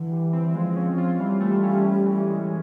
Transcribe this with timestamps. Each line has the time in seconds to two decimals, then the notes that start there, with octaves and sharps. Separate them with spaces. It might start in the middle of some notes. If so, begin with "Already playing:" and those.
Already playing: D3 E3
0.12 G3
0.33 C4
0.54 F3 G#3
0.76 C#4
0.98 F4
1.19 E3 G3
1.41 A3
1.63 C#4
1.84 A2
2.06 E3
2.27 G#3